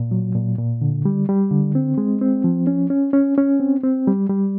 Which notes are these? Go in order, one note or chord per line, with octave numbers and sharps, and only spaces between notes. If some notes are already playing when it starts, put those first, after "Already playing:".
Already playing: A#2
F#3
A#2
A#2
D3
G3
G3
D3
C4
G#3
C4
F3
C#4
C#4
C#4
C#4
C4
C4
G3
G3